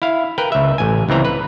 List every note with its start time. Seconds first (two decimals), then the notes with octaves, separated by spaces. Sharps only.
0.02 E4 F5
0.38 A#4 B4 G5
0.52 C#2 E5
0.78 A1 G#5
1.09 C#2 E3 C4 A#5
1.25 B4